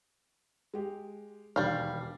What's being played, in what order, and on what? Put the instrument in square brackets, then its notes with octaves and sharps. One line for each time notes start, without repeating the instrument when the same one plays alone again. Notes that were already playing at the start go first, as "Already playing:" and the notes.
[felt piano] G#3 G4
[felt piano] E1 D#2 D4 [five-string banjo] G3 F5